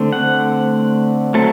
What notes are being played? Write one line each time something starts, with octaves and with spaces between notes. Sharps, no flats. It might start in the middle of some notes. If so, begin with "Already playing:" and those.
Already playing: D3 A3 C4
F#5
F#3 A3 C4 A4